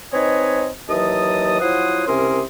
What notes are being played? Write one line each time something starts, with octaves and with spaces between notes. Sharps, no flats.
C4 D#4 B4 C#5 D#5 G#5
D#2 E3 F#3 D#5 A5 D#6
F3 F#3 E4 C5 F#5 D#6
C2 C3 C#4 A#4 C6 D#6